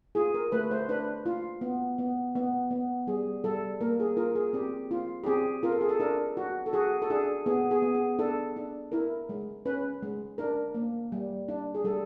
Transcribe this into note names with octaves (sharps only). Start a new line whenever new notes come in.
F4 G#4
A#4
A3 B4
C5
D4 B4
F4
B3
B3
B3
B3
G3 G#4
G3 A4
A#3 A#4
G#4
F4 A#4
G#4
C4 G4
F4
G4
C4 G#4
F4 A#4
A4
G#4
A4
D4 A#4
F#4
A4
F#4 G#4
A4
D4 G#4
B3 G#4
G#4
B3
G#4
D4 A4
D4
E4 A#4
G#3
C#4 B4
G#3
D4 A#4
A#3
G3
D4
G#4
G3 A4